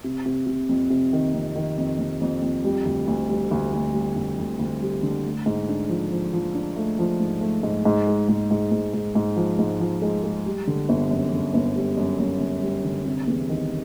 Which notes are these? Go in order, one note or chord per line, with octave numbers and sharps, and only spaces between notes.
C3
C3
C3
F2
C3
D#3
F2
D#3
F2
F2
F2
F2
G3
D2
D2
G3
D2
D2
G3
D2
D2
D2
G3
D3
A3
G#2
D4
F3
F3
F3
D4
A3
F3
G#2
A3
G#2
G#2
G#3
G#2
G#2
G#2
G#2
G#2
F3
G#2
F3
G#3
G#3
G3
D3
G1
F#2
D3
G1
G3
F#2
F#2
G1
G3
D3
C3
E2
D#3